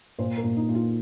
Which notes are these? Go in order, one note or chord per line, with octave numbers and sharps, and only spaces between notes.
A#2 C5
A#4
A#2
D#4
A#2
F4